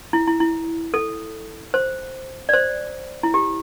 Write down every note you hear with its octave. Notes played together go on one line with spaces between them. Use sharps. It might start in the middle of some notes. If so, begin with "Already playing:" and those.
E4
E4
E4
A4
C5
D5
C5
E4
G4